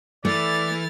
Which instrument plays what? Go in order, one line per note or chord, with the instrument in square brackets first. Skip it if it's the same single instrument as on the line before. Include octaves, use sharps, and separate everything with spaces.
[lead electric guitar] E3 [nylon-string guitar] A3 [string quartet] E4 F6 A6 [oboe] D5